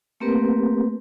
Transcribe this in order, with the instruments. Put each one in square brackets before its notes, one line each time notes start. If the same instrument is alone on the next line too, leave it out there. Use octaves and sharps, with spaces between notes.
[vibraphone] A3 A#3 C4 G4 A#4 B4